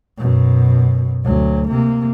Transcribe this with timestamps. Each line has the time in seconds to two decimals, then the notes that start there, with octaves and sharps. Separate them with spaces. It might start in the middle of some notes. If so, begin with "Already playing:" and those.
0.18 F#2 B2
1.24 D2 F#3
1.68 C3 A#3